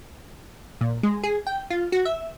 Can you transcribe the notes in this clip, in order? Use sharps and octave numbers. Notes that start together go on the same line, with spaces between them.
A#2
G#3
G#4
G5
F4
F#4
E5